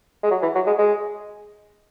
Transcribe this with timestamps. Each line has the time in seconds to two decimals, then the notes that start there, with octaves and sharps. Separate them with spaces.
0.23 G#3
0.31 F#3
0.42 E3
0.55 F#3
0.67 G#3
0.78 G#3